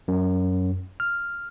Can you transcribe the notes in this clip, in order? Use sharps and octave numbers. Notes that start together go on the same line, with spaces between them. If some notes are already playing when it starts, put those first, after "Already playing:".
F#2
F6